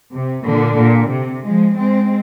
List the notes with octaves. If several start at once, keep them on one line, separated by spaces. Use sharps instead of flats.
C3
A#2 D3
A#2
C3
F3 G#3
G#3 C4